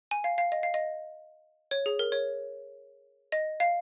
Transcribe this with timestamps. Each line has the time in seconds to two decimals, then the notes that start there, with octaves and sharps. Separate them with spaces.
0.11 G#5
0.24 F5
0.38 F5
0.52 D#5
0.63 F5
0.74 D#5
1.71 C#5
1.86 G#4
1.99 A#4
2.12 C#5
3.32 D#5
3.60 F5